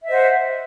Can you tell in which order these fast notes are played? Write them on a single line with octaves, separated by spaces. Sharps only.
E5 D#5 C5 F#5